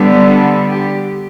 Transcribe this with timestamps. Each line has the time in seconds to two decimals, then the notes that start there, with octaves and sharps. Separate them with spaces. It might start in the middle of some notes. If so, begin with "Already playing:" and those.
Already playing: D3 G3 B3
0.25 A4
0.71 G4